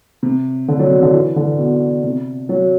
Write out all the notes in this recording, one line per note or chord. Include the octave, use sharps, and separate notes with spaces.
C3
D3
F#3
C3
D3
E3
D3
B2
C3
F#3